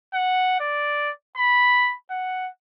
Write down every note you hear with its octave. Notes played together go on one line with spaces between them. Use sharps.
F#5
D5
B5
F#5